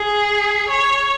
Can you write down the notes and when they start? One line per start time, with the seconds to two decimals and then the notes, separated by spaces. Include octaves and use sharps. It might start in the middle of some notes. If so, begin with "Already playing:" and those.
Already playing: G#4
0.69 C#5